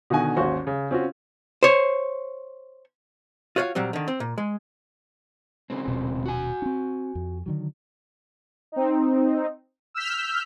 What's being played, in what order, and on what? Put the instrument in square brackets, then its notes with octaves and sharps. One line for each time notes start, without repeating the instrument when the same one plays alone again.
[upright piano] B2 D3 D#3 F#5 G#5
G#1 D#2 C#4 F#4 C5 C#6
C#3
C4 C#4 F4 F#4
[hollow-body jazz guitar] C5 C#5
F4 F#4 C#5 D#5 F5
A#2 F#3 G3 C4
D3 D#3
C4
A#2
G#3
[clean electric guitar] C#3 G#3 C4
[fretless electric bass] D#1 B2
[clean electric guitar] F#4 G#5
[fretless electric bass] C4 D4
F2
D3 D#3 F#3
[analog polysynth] C4 D#4
E6 F6 G6 B6